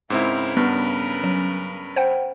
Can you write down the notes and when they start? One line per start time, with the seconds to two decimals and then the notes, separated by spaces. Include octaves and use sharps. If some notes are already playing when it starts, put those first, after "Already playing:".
0.10 G#2 C#3 C4 E4 A#4 B4
0.57 G2 B3 D4 F6
1.24 F#3 C#4
1.96 C5 F#5 G5